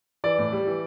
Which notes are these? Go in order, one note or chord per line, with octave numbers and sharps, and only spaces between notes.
E3 D5
A2
G3
E3